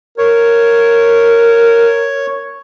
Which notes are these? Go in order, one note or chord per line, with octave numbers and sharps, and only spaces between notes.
A#4 C#5